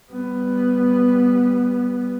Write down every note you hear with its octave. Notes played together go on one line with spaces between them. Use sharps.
G3 B3